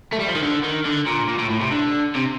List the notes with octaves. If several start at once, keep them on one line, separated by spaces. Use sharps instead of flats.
A3
G3
F3
D#3
D3
D#3
D3
A#2
A#2
A2
A2
C3
D3
C3